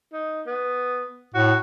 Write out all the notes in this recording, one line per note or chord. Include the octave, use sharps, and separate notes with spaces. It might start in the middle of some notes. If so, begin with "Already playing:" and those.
D#4
B3
A2 F#4